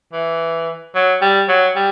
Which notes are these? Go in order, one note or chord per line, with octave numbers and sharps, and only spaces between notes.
E3
F#3
G3
F#3
G3